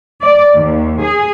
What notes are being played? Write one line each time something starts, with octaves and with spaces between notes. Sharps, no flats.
D5
D#2
G#4